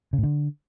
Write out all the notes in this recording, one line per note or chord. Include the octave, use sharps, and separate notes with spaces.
C#3
A2
D3